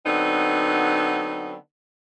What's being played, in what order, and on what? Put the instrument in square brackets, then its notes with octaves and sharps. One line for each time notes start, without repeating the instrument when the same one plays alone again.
[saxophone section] D3 F#3 B3 C4 D#4